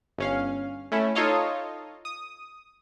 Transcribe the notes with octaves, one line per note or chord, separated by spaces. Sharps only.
G1 C#4 F5
A3 C#4 E4
D#4 F4 A4 C#5 D#5 F5
D#6